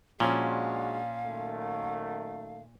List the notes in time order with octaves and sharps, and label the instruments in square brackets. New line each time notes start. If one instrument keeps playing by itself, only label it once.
[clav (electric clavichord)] A#2 [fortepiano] F3 C#4 [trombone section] G#3 D4 F#4 [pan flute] F5
[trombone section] F#2 D#3 A3